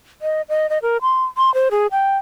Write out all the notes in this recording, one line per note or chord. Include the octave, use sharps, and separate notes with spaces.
D#5
D#5
D#5
A#4
C6
C6
C5
G#4
G5